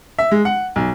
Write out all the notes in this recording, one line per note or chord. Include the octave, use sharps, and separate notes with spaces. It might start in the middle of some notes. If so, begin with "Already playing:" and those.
E5
G#3
F#5
B1